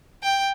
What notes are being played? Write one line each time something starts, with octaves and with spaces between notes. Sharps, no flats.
G5